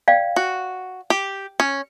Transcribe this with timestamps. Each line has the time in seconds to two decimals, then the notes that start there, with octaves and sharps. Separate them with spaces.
0.08 D5 F5 G5
0.36 F#4
1.10 G4
1.60 C#4